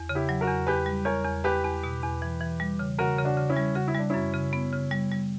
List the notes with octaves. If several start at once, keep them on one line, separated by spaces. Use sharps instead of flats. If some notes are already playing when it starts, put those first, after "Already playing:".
Already playing: E2
C#3
E4 G4
F#3
F#4 A#4
E2
E2 G4 B4
G3
E2 A#4 C#5
E2
E2 G4 B4
E2
B2
E2
E3
E3
G3
C#3
C#3 F#4 A#4
C#3
D4 F#4
C#3
C#4 E4
G3
C#3 F#4
E4
G3 D4
F#2 C#4 E4
C#3
B3
C#3
G3
G3